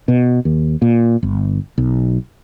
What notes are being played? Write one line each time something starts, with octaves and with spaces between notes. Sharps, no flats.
B2
D#2
A#2
G1
B1